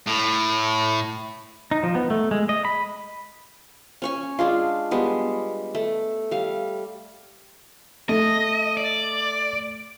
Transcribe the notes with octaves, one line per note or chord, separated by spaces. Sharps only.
A2
D#4
F3
B3
A3
G#3
D#5
B5
C#4 C#5 G#5
G#3 D4 F4
G3 G#3 B3
A3
G3 F5
A3 D#5
D5